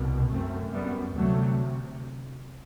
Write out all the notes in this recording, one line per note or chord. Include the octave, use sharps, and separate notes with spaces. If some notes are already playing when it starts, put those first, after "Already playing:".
Already playing: C2 B2
F#2 A3 C4
G3 B3
D2 C3 F#3 A3